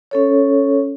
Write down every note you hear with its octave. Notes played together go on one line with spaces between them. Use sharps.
C#4 A4 C#5